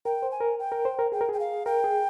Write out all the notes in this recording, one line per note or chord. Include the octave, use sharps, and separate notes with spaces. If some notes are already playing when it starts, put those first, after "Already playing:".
A#4 G5
C5
G#5
A#4
G5
A#4
C5
A#4
G#4 G5
A#4
G#4 G5
F5
A#4 G5
G#4